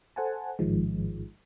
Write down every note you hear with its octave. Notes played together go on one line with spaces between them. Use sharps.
A4 C5 F#5 G#5 A5
A1 G#2 D#3 F3 G#3